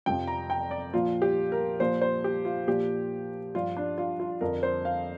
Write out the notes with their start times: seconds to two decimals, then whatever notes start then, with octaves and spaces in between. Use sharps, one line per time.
0.06 F2 C3 F3 G5
0.27 A#5
0.50 G5
0.71 D5
0.93 A#2 F3 F4
1.22 G4
1.52 A#4
1.80 A#2 F3 C5
2.01 C5
2.24 G4
2.45 F4
2.67 A#2 F3 G4
3.55 G2 F3 F4
3.77 D4
3.98 F4
4.20 F4
4.41 F2 D3 F3 A#4
4.63 C5
4.85 F5